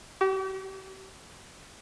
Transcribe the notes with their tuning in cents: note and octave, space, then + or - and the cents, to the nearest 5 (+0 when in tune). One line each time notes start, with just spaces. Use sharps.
G4 -40